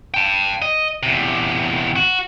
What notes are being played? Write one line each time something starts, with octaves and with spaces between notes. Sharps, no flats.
G5 A5
D#5
E2 C3
F#4